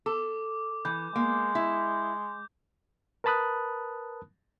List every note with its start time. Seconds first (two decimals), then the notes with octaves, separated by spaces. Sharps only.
0.06 A4 D6
0.85 E3 G6
1.16 G#3 A#3
1.55 E4
3.24 A#4 B4 A5 B5 D#6 F#6